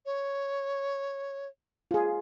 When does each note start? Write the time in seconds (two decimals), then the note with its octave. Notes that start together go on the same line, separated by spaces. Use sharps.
0.06 C#5
1.91 F4 G#4